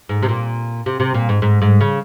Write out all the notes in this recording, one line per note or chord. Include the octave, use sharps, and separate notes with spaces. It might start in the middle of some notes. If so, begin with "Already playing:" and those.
G#2
C3
A#2
C3
C3
A#2
G#2
G#2
G#2
C#3